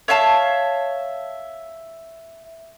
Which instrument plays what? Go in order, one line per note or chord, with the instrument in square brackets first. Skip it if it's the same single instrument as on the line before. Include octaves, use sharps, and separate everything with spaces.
[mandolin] C#5 E5 F5 A5